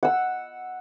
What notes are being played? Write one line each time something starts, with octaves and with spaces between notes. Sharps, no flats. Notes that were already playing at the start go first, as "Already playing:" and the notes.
F#5 E6